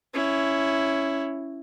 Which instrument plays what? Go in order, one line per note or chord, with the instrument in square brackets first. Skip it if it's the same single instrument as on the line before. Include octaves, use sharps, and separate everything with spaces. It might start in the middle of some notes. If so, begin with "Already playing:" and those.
[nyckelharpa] C#4 E4